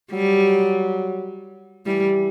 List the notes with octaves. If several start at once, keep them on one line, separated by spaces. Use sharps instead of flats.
F#3 G3
E3 G3